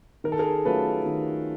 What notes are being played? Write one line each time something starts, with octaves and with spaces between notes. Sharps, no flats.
D#3 A#4
A4
G#4 A#4
F#3 A3 C#4 F4 A4 B4
D#3